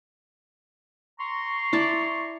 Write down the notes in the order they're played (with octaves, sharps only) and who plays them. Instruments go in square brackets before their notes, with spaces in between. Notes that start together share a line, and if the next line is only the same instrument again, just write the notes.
[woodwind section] A#5 C6 C#6
[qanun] E4 D5 A5